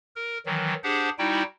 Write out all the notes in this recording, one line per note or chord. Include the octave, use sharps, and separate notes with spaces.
A#4
D#3 E3 F#3
D4 G4 G#4 C5 F#5
G3 D#4 E4 F#4 G5